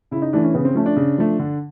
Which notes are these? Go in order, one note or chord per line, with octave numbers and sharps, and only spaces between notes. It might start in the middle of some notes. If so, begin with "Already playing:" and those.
C#3 E4
D#4
E3 A3 D4
C#4
C#3 B3
C4
F3 A3 C#4
D4
C#3
F3 A3
D3